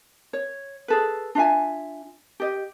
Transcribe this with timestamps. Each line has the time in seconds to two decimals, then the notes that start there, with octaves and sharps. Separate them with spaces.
0.33 C#5
0.88 G#4 A4 B4
1.35 D4 F4 E5 G#5
2.40 G4 D#5